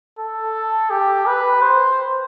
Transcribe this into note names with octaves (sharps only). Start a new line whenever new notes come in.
A4
G4
B4
C5